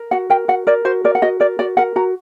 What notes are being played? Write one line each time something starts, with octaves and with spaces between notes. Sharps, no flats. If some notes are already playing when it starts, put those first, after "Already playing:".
Already playing: A#4
F#4 F#5
A#4 G5
F#4 F#5
A#4 D5
F#4 C5
A#4 D5
F#5
F#4 D#5
A#4 D5
F#4 D5
A#4 F#5
F#4 A#5